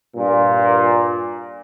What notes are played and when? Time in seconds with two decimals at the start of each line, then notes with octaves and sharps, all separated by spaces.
0.16 G2 A#2